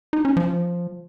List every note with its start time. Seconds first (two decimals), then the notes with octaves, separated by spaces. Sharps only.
0.13 D#4
0.25 C#4
0.37 F3